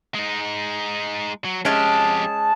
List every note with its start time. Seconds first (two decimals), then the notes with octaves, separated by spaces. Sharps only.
0.15 G#3 D#4
1.45 F#3
1.65 F2 G#3 C#4 G4 A5